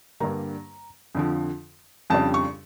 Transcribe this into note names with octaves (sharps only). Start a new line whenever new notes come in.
G2 D3 G3 A#3 A#5
F2 D3 F3
F2 C#3 G3 D4 A5
C#6